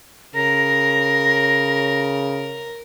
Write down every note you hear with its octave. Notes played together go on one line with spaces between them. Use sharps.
C#3 A#4 A#6